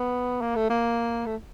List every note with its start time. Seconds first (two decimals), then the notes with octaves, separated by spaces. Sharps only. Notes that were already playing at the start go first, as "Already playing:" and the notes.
Already playing: B3
0.42 A#3
0.56 A3
0.70 A#3
1.26 A3